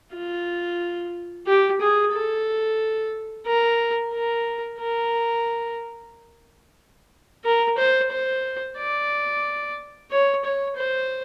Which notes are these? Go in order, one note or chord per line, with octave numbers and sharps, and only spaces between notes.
F4
G4
G#4
A4
A#4
A#4
A#4
A#4
C5
C5
D5
C#5
C#5
C5